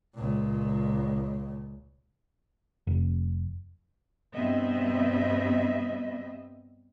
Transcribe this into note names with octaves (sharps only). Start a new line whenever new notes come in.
C#2 A#2
F1
G2 B2 B3 C4 D#5 E5